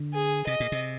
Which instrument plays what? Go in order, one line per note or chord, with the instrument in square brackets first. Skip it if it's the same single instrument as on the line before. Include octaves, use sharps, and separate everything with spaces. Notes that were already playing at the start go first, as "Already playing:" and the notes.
Already playing: [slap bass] D3
[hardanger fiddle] G#4
[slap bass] C3 [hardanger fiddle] D#5
[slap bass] A#2
C3